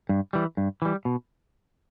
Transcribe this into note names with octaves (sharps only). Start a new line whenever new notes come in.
G2
E3 G3
G2
E3 G3
B2